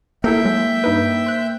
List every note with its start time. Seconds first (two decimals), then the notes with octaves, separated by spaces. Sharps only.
0.24 A#3 E4 A4 A#4 E5 G5
0.44 F#3 G#3
0.84 G2 D#4 B4
1.26 C5 F#6